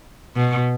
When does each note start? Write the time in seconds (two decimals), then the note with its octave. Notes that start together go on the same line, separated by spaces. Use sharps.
0.35 B2